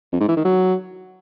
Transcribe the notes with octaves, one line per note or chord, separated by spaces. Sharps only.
F2
G#2
E3
D#3
F#3